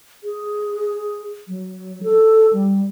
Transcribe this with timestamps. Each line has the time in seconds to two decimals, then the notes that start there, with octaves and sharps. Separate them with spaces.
0.24 G#4
1.48 F#3
2.03 A4
2.53 G3